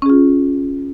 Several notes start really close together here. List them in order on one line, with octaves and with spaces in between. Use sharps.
C#4 G#4 F4